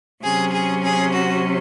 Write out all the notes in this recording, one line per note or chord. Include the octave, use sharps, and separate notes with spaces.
C3 F#3 C#4 G#4
G#4
G#4
F#4